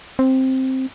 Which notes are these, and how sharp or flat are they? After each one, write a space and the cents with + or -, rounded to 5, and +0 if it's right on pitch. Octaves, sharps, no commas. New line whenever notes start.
C4 +5